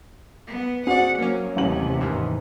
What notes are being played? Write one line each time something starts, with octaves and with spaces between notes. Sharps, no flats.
B3
C4 F#4 G#4 D5 F#5
F#3 A#3 C#4
A1 D#2 C3 F#7
G#2 D#3 E3